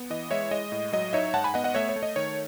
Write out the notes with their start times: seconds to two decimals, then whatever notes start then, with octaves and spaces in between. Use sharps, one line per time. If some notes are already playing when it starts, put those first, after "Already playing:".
Already playing: B3
0.10 E3 D#5
0.31 G#3 C#5 E5
0.51 G#3 D#5
0.72 A2
0.93 F#3 D#5
1.13 D#4 C#5 E5
1.33 G#2 F#5 A5
1.44 G#5 B5
1.54 B3 D#5 F#5
1.64 D#5 F#5
1.75 A3 C#5 E5
1.89 C#5
1.96 A3
2.03 D#5
2.16 D#3 C#5